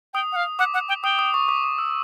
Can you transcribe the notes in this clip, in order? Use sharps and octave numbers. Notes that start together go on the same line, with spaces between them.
G5 D#6
F#5
F5
F#5 D6
F#5
G5
G5 D#6
D#6
C#6
D6
D#6
E6